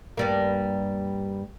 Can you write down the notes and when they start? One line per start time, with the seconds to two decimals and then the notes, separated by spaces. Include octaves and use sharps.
0.17 G2 G3 A#3